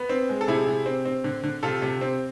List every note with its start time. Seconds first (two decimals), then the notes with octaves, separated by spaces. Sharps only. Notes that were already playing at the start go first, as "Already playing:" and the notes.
Already playing: B3
0.09 C4
0.29 G#3
0.41 A4
0.48 C3 E4 G#4
0.66 C3
0.86 C4
1.06 C4
1.24 D3
1.43 D3
1.63 C3 F4 A4
1.82 C3
2.01 C4